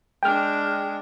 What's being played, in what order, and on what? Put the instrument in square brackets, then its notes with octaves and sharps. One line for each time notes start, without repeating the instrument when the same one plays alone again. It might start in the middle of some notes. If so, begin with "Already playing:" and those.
[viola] G#3 D4 [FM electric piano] G5 F6